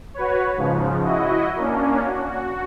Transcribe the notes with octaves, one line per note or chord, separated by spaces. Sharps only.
F#4 B4 C#5
G#2 C#3 F3
E4 F#4 D#5
A#3 C#4 D4
F#4